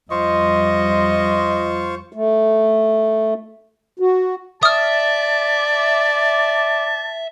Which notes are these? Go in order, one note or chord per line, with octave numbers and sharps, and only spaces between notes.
F2 G3 F4 C5 D#5 C#6
A3
F#4
D5 E5 A5 D#6 F6